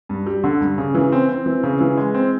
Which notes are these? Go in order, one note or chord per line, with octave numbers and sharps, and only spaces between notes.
G2
G3
D3
G2
C#3
E3
C4
C4
E3
C#3
E3
G#3
C4